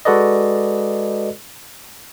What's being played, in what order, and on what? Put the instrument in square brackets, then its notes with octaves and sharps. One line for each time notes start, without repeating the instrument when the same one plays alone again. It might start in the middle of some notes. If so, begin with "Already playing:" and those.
[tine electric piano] G#3 F#4 A4 B4 D5 D#5